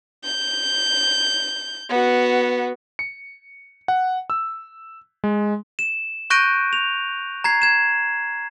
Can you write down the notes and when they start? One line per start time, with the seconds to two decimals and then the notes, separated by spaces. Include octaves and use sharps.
0.24 G6
1.89 B3 F#4
2.99 C#7
3.88 F#5
4.30 E6
5.24 G#3
5.79 E7
6.30 C#6 F#6 G6 A#6 D7 D#7
6.73 F7
7.44 A#5 G#6 C7
7.62 G#6 E7